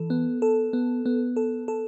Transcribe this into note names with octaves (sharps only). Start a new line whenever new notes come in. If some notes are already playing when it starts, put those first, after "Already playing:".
Already playing: E3 A4
B3
A4
B3
B3
A4
A4